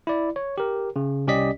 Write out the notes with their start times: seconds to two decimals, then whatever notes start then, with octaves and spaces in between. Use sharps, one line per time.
0.07 E4 D5
0.36 C#5
0.58 G4 A#4
0.96 C#3
1.27 C2 C#4 G4 D5 D#5 B6